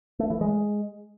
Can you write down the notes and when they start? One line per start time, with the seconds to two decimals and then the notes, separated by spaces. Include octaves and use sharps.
0.19 A3
0.30 E3
0.41 G#3